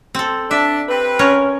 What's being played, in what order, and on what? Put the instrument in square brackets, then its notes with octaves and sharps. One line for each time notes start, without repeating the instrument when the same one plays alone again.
[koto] C4 A4
[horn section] D4 [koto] E5
[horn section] C4 G4 B4
[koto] C#4 A#4 C#5